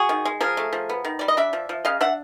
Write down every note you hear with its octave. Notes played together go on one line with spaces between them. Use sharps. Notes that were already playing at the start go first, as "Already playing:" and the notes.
Already playing: F#4 G#4
D#3
G#3
F3 G#4 A#4
A3
F3
B3
D#3
G3 D5
D#5
D4 D5 E5
F3
F3
C#3 D#5 F5
D4 E5 F#5